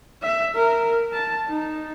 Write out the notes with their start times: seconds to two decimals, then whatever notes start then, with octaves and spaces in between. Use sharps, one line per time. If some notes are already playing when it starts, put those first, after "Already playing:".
0.22 E5
0.55 A#4
1.13 A5
1.48 D#4